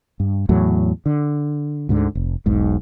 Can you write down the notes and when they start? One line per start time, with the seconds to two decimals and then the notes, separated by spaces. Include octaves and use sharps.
0.20 G2
0.49 E2 A2 F#3
1.06 D3
1.89 D2 G#2 D3
2.15 F1
2.46 E1 B1 G#2